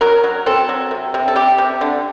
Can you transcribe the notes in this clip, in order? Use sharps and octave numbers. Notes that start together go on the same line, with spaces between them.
F#3 A#4
F#3
C4 A4
F#3
C3
C3
A4
C3 G4
C3
D3